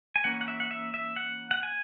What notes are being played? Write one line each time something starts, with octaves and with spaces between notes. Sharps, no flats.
G#5
E3 A#3 C#4 F#5
F#5
E5
F#5
E5
E5
F#5
F#5
G#5